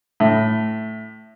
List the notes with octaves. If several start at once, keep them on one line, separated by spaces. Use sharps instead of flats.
A2